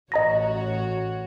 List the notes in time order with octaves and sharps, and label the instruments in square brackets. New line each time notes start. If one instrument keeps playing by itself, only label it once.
[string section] A1 F#4 C#5 [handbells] D#5 A#5 A#6